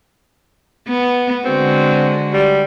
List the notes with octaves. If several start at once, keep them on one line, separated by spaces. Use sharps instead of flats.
B3
D3 G#3 C4 F#4
G3